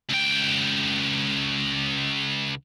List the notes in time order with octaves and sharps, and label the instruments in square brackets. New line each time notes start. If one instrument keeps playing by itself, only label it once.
[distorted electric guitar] C#2 G5